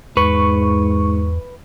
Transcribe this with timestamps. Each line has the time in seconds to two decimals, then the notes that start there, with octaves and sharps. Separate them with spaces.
0.17 E2 G#2 B4 C#6